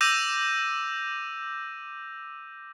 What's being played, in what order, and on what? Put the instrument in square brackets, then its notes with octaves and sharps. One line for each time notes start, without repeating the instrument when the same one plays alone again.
[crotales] D6 E6 G6 A#6 D#7 F7